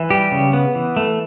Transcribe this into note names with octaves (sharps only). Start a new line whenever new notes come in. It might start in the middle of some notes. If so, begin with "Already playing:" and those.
Already playing: E3
G3 G4
C#3
B3
E3
A3